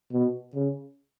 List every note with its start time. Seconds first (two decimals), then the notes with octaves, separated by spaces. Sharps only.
0.12 B2
0.55 C#3